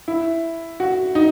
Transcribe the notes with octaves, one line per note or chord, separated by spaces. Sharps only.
E4
F#4
D#4